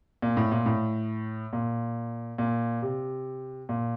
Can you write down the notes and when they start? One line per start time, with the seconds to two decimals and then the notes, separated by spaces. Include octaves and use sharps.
0.22 A#2
0.37 A2
0.52 A#2
0.66 A2
1.53 A#2
2.38 A#2
2.82 C3
3.69 A#2